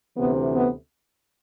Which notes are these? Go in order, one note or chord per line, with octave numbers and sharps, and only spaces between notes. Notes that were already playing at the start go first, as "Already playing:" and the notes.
D2 C3 E3 B3
B3